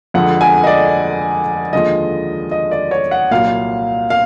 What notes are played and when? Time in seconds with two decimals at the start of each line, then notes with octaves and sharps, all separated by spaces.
0.14 F2 D3 F3 G#3 F#5
0.41 G#5
0.64 D#5
0.67 D5
1.73 D#2 D3 F3 G#3 D#5
2.51 D#5
2.71 D5
2.91 C#5
3.11 F#5
3.31 C2 A#2 F#3 F5
4.10 F5